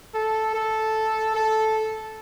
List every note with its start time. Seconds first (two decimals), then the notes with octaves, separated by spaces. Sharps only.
0.15 A4
0.55 A4
1.35 A4